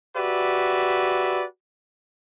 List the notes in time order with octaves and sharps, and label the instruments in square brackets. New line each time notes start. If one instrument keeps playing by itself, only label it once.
[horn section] F#4 G4 B4 D5 E5